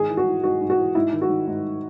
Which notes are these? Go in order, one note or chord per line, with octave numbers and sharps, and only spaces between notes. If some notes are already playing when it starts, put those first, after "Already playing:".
Already playing: G#2 D#3 G#4
E3
F#4
E3
G#2 F#4
G#2
F#4
E3
G#2 E4
D#3
F#4
D#3
G#2